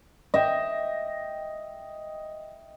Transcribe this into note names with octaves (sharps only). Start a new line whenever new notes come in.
D#5 E5 G5